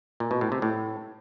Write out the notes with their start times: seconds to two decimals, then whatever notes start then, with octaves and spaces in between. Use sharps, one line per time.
0.20 A#2
0.31 B2
0.41 A2
0.52 C3
0.62 A2